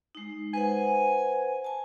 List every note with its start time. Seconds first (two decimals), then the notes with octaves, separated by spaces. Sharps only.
0.15 G#3 D#4
0.54 B4 C5 F#5 G#5
1.64 G#5 A5